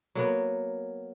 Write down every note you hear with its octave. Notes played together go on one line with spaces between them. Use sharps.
F#3 A#3 B3